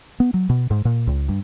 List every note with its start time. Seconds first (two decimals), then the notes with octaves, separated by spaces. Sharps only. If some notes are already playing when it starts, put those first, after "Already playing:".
0.20 B3
0.34 F#3
0.49 B2
0.71 G#2
0.85 A#2
1.07 C#2
1.29 G2